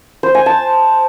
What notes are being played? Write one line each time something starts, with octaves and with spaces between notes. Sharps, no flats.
C5
G#5
A5